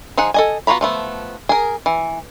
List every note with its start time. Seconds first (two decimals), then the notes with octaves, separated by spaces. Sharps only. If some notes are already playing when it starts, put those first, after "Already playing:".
0.17 F3 D#4 G#4 F#5
0.34 A4 D#5 G#5
0.67 B3 F4 F#4 A#5 B5
0.81 F3 A3 B3
1.49 G#4 A#4
1.86 E3